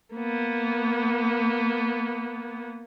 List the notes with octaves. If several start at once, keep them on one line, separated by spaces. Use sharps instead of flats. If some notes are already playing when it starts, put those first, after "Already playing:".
A#3 B3